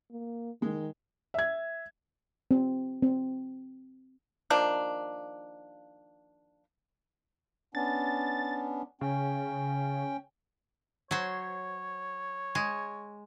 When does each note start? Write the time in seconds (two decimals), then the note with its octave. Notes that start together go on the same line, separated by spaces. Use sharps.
0.11 A#3
0.62 D#3 G#3
1.34 E5 G#6
2.51 C4
3.02 C4
4.50 D#3 F3 A#3 D4
7.75 B3 C#4 D4 A6
9.01 C#3 C#4 G5
11.11 F#3 C5 C#5
12.55 G#3